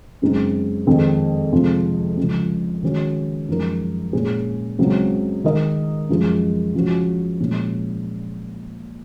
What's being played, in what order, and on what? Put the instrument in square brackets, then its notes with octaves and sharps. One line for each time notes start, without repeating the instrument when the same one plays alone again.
[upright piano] F#2 C#3 G#3 C4 D#4
F2 D#3 G#3 C4
F2 C3 F3 G#3
C#2 C#3 F3
D#3 G#3 C#4 F#4
F#2 F3 G#3 D#4 A#4
A#2 G#3 C#4 G#4
C#2 C#3 F#3 C4
D#3 G#3 D#4 A#4 D#5
F#2 F3 G#3
C#3 F3 G#3 C#4 F#4
A#2 F3 G#3 C#4